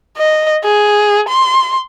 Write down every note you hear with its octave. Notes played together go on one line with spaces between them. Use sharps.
D#5
G#4
C6